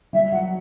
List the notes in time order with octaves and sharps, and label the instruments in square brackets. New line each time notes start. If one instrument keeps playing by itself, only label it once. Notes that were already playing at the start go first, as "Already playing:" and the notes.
[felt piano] G3 [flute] E5
[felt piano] F#3 [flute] F#5